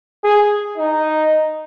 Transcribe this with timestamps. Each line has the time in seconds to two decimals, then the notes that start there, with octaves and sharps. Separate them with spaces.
0.24 G#4
0.78 D#4